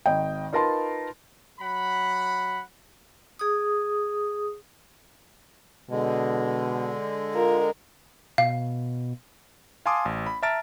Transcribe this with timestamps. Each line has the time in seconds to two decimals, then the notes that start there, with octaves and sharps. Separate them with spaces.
0.06 G#1 D#5 G5
0.53 D#4 F4 A#4 B4 A5 C6
1.60 F#3 F#5 B5
3.39 G#4 D#6
5.90 B2 D3 G#3
7.35 F4 A#4
8.38 B2 F5
9.86 F5 G#5 A5 C6 D6 D#6
10.05 A1
10.26 B5
10.43 E5 A5 A#5 F6 A6 D7